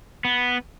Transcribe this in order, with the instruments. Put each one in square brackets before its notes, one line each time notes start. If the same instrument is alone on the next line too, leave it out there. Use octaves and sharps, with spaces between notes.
[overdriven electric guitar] B3